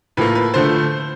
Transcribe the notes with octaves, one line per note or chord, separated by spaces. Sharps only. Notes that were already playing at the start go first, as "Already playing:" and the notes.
A2 F3 A#3 B4
B4
D3 F3 A3 C5